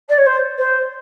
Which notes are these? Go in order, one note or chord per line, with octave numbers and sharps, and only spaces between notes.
D5
C#5
C5
C5